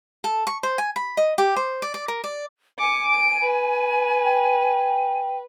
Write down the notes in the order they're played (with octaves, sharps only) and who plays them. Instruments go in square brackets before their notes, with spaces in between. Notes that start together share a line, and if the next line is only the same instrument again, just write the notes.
[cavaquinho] A4
C#6
C5
G#5
B5
D#5
G4
C5
D5
D5
A#4
D5
[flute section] G#5 [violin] D6 C#7
[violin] D7
B4
[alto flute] G5